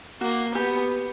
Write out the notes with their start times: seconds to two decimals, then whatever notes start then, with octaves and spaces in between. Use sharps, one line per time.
0.21 A#3 F#4
0.55 B3 G4